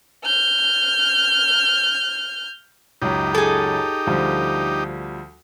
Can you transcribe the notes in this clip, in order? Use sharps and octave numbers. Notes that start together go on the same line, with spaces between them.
F6 G6
C#2 F#2 D#4 G4
G#4 A4
D2 F3 G3